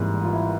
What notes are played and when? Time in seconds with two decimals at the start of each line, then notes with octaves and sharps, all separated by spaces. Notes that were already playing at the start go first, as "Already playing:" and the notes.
Already playing: G#1 G#2 E3 G3 A#3 E4
0.23 F4
0.33 E4